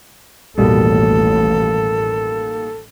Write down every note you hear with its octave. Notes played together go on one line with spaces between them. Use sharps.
A1 D#2 B2 G3 A4